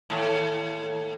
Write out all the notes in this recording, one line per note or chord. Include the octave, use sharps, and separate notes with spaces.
D#2 A2